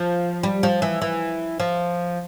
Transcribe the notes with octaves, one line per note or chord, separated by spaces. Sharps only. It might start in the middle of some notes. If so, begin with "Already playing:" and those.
Already playing: F3
G3
F3
E3
E3
F3